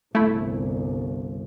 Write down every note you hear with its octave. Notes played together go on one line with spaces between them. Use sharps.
G1 C2 A3 E4